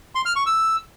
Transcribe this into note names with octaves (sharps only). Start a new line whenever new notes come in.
C6
F6
C#6
E6